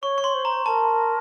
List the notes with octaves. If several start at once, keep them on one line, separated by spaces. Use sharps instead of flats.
C#5 C#6
C#6
C6
C5
A#5
A#4 A5